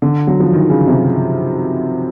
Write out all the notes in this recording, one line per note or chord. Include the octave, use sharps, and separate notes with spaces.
D3
F#3
F3
D#3
C#3
C3